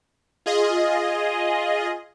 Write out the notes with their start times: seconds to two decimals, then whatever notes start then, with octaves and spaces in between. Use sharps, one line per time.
0.46 F4 G#4 D#5